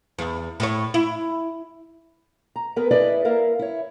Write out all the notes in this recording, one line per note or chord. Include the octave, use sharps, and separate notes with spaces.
E2
A2 C#5
E4
A#5
B3 G#4 A#4 B4
E4 G#4 A4 B4 D5 D#5
A#3 E4 A#4 F5
E4 C#5